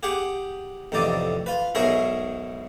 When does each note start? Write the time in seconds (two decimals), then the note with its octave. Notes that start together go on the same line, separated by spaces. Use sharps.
0.03 G4 G#4 F#5 G5
0.92 A1 F2 C3 D#4 D5
1.46 F4 B4
1.75 B1 G#2 G#4 A#4 C#5 E5